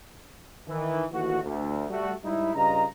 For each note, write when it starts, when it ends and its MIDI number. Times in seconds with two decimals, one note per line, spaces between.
0.68 1.05 51
0.68 1.05 52
1.11 1.38 39
1.11 1.38 52
1.11 1.38 57
1.11 1.38 66
1.43 1.85 38
1.90 2.11 55
1.90 2.11 57
1.90 2.11 66
2.24 2.54 44
2.24 2.54 55
2.24 2.54 63
2.24 2.54 64
2.55 2.84 43
2.55 2.84 49
2.55 2.84 65
2.55 2.84 75
2.55 2.84 82